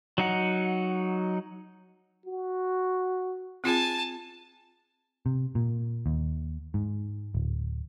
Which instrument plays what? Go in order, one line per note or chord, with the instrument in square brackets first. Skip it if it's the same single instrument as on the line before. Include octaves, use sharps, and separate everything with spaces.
[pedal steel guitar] F#3 D#4 F#5
[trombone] F#4
[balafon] C4 F4 G#4 [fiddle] G#5 A5
[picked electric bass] C3
A#2
D#2
G#2
D1